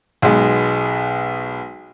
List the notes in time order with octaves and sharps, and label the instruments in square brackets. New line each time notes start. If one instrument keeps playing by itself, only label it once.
[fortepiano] B1 G#3 B3